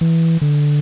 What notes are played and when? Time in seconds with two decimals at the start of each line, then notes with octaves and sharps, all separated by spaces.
0.01 E3
0.41 D3